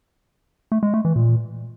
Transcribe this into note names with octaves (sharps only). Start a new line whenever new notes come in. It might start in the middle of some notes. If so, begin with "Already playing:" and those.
A3
G#3
A3
E3
A#2